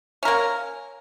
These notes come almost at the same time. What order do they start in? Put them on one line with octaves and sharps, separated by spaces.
C#4 A#4 A#3